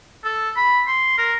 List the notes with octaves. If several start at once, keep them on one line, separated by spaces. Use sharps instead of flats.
A4
B5
C6
A#4